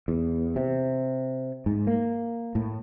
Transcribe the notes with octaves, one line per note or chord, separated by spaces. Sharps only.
E2
C3
G#2
A#3
A2